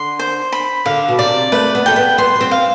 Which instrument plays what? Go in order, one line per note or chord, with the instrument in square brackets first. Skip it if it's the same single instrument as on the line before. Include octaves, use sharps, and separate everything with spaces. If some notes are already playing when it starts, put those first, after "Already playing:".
Already playing: [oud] D3 [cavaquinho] C6
[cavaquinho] C5
B5
[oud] D3 [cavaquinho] F5
[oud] B2
[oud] C3 [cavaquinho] D5
[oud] A3 [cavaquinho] B4
[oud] B3
[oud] A3 [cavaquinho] G5
[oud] B3
[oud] B3 [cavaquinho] C6
[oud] B3
C4
[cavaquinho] F5